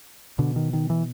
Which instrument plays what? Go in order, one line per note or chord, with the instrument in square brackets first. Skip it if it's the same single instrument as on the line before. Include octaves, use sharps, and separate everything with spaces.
[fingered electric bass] B2 D3
D#3
D#3
E3